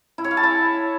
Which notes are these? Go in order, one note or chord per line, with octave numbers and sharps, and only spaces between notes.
E4
C#5
F5
A5
E4